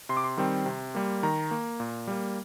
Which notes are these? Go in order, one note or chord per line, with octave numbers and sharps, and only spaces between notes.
C3 C6
D6
C6
D#3 G3 C4
C3
G3 A#3
D#3 A#5
A#3
A#2
G3 A#3